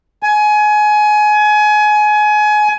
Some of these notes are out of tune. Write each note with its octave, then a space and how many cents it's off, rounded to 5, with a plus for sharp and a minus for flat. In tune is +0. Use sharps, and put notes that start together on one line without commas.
G#5 +25